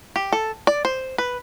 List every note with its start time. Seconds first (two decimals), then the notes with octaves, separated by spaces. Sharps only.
0.16 G4
0.33 A4
0.67 D5
0.85 C5
1.18 B4